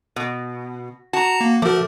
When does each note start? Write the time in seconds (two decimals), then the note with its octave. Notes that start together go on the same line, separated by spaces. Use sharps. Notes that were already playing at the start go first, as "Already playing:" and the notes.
0.16 B2
1.13 F#4 A5 A#5
1.41 A#3
1.62 F3 A3 F#4 A#4 D6